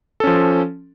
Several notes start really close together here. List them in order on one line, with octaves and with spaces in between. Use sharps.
A4 C#4 F3